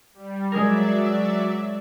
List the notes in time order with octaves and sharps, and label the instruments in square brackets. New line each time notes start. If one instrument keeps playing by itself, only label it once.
[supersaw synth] G3
[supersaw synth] F#3 D5 E5 [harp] G#3 G#4 A#4
[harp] C7